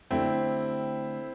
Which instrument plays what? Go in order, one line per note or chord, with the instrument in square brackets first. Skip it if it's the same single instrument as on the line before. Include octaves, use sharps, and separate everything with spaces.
[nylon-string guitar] D3 A3 D4 G4 [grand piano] C4 E4